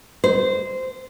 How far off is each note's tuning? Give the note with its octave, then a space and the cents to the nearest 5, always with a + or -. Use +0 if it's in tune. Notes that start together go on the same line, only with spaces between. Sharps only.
C5 -15